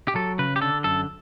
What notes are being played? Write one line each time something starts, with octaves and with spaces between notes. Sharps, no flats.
G4
F#3 A4
C#3 B4
G4
D3 A4
F#2 A4